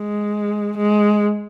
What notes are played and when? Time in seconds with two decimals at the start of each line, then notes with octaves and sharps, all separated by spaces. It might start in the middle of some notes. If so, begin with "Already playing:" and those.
Already playing: G#3
0.77 G#3